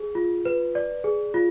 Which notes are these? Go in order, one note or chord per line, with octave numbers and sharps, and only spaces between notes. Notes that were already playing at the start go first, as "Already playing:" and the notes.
Already playing: G#4
F4
B4
D5
G#4
F4